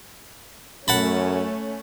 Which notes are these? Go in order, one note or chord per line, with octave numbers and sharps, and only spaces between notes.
F#2 A3 C#4 F#5 A5 B5